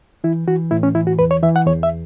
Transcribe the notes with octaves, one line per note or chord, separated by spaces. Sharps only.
E3 E4
E3 F#4
A2 E4
C#4
E3 E4
F#4
E2 B4
C#5
E3 E5
F#5
E2 C#5
E5